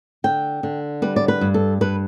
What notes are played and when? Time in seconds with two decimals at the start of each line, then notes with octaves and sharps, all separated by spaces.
0.24 D3 G5
0.63 D3
1.02 G3 B4
1.16 D5
1.28 B4
1.41 G2
1.54 A4
1.81 G2 B4